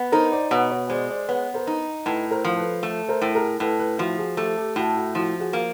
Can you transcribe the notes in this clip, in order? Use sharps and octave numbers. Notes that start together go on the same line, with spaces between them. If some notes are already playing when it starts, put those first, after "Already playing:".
Already playing: B3
D#4 A#4 C5
C5 D5
B2 B4 C#5
B4 C#5
G#3 C5 D5
C5 D5
B3 B4 C#5
A#4 C5
D#4
A2 A4 B4
A#4 C5
F3
A4 B4
A3
A#4 C5
A2
G#4 A#4
A2 A4 B4
A4 B4
F3 E4 F#4
F#4 G#4
A3 G4 A4
G4 A4
A2 E4 F#4
E4 F#4
F3 E4 F#4
F#4 G#4
A#3